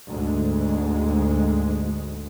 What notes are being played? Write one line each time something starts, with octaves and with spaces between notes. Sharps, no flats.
D2 G#2 G#3